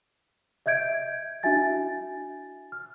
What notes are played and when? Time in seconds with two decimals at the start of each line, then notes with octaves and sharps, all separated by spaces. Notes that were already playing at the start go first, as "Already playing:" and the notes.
0.66 D#5 E5 G6 G#6 D7
1.43 D4 E4 F#4 E5 G#5 A6
2.72 F6